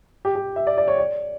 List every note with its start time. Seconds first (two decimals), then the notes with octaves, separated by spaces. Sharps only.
0.25 G4
0.35 G4
0.56 E5
0.67 D5
0.77 D5
0.88 C#5
0.98 D5